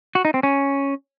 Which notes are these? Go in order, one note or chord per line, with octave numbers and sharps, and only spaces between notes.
F#4
D#4
C4
C#4